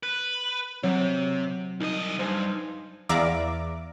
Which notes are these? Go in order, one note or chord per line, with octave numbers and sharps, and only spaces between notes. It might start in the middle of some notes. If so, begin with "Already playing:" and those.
B4
C3 F#3 C4 C#5
C2 D#4 D#5
G2 C5 G#5
E2 D5 E5 F5 A#5 D6